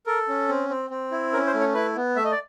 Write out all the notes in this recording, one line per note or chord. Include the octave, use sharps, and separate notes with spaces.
A4 A#4
C#4
C4
C4
C4
E4
C#4 A#4
C5
A3
C#5
E4 B4
B3
A3 E5
D#5
D5